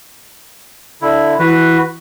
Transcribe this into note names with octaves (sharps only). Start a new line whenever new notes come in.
D3 E4
E3 F#4 B4